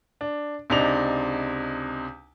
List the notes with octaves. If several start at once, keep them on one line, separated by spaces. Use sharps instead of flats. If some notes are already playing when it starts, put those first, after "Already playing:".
D4
C#2 C3 D4 D#4 F7